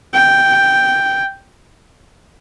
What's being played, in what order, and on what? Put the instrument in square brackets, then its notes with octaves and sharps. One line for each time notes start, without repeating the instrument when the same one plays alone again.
[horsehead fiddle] G5